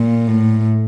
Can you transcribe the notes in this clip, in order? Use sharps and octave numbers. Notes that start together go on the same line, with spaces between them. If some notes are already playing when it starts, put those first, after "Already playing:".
Already playing: A#2
A2